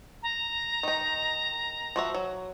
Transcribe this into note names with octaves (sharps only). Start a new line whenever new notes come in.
A#5
D#3 D#4
F3 F#4 E5
F#3